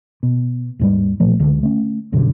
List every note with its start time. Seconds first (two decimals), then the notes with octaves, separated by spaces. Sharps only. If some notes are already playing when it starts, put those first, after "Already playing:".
0.23 B2
0.79 D#2 G#2 G3
1.20 B1 A#2 F3 A3
1.40 C#2 D3
1.63 A3 C#4
2.12 C2 F#2 B2 D3